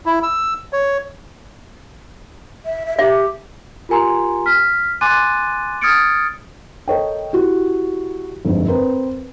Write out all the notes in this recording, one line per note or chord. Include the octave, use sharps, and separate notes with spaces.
E4
E6
C#5
E5
E5
G4 E5
F4 G4 A#4 G#5 A#5 C6
F6 B6
G#5 C6 D6 F#6 A6 D#7
D#6 F6 G#6 A6 C#7 D7
A4 A#4 C#5 D#5 G5
E4 F#4 G4
G1 F2 G#2 D3
C4 A#4 B4